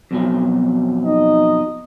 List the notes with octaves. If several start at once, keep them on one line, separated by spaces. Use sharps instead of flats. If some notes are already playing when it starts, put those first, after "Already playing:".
F2 B2 F#3
D#4 D#5